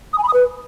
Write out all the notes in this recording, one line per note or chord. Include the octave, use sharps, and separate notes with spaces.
D#6
G#5
B5
D#6
B4